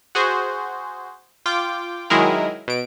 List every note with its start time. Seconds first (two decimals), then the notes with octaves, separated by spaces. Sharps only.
0.15 F#4 G#4 C5
1.46 F4 G5 D6
2.10 D#3 F#3 G#3 E4 G#4 A#4
2.68 B2 D7